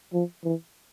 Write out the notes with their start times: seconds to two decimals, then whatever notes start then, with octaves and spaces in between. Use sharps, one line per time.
0.13 F3
0.44 E3